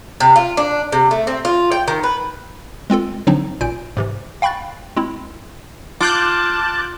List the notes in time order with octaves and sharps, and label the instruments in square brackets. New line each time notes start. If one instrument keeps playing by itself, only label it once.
[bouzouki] C3
F4
D4
C3
A3
C4
F4
G5
D#3
B4
[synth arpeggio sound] G#3 C4 F4 A4
D3 F3 F#3 C4 D4 D#4
A1 A#2 G#5 G6 D7
G#2 C3 E3
F5 G5 B5 C#6 F#6 A6
G#3 C4 E4
[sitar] F4 [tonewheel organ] A5 [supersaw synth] D6 F#6 G6